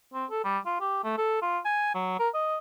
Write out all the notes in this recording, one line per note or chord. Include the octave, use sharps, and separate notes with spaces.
C4
A4
G3
F4
G4
A3
A4
F4
G#5
F#3
A#4
D#5